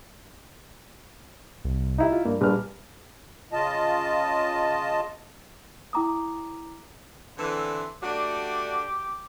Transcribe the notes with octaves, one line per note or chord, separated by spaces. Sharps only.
C2
D#4 E4 G4
F4
G2 A#3
A#1 G3 B4 F6
C#3 F4 D#5 A5
E4 G5 A#5 D6 D#6
D3 E3 C4
A3 D4 F#4 G4